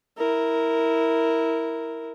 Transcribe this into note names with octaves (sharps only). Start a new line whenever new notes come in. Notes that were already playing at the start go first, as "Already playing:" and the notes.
E4 A#4